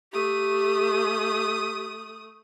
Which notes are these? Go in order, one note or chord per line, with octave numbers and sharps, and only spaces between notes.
A3 G4 D#6